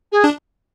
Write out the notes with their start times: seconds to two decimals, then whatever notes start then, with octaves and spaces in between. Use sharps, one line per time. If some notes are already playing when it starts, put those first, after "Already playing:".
0.12 G#4
0.24 D4